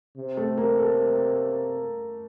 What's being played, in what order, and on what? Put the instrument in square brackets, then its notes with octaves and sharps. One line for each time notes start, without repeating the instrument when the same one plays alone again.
[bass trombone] C3
[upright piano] A3
A#3
A4